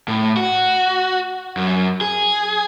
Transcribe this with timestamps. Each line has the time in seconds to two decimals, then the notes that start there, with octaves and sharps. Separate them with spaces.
0.08 A2
0.37 F#4
1.57 F#2
2.01 G#4